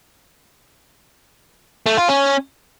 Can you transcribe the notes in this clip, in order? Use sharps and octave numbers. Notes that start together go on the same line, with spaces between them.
A3
F4
C#4